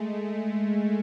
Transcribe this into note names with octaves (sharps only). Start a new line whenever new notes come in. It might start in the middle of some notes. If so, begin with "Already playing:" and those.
Already playing: G#3 A3